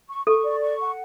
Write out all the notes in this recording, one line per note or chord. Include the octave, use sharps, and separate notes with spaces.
C#6
A4 C#6
D5
C#6
F#5